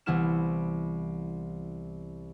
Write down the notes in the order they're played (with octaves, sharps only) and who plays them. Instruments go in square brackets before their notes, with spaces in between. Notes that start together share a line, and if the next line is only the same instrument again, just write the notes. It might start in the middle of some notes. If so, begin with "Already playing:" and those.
[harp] C2 E3 B3 E4 F6 E7